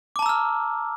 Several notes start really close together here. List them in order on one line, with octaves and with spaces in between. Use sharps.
D6 A5 A#5 E6 F6